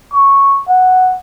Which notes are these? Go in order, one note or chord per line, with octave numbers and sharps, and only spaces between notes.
C#6
F#5